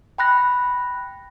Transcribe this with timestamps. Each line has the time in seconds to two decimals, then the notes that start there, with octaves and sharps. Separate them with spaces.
0.18 G5 B5 F#6 A#6